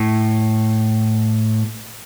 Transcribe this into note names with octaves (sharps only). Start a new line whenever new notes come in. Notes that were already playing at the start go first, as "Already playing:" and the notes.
Already playing: A2